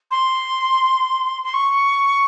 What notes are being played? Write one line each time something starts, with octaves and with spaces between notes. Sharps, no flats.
C6
C6
C#6